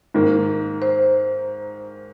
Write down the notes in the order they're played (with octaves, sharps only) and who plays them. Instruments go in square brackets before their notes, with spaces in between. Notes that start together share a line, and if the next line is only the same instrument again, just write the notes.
[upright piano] G#2 D#3 A#3
[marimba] C5